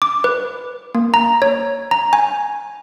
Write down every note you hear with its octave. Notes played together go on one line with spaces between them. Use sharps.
D6
B4
A#3
A#5
C#5
A#5
G#5